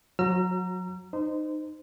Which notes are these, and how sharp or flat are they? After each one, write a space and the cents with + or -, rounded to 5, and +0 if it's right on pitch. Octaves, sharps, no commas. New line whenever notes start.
F#3 -25 A#5 +0 E6 +45
D#4 -20 C5 -25